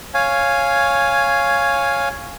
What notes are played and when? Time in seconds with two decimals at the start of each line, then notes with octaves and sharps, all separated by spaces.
0.14 C#5 F5 G#5